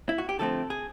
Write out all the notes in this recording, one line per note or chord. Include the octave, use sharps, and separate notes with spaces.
E4
F#4
G4
D3 F3 A3 C4 A4
G#4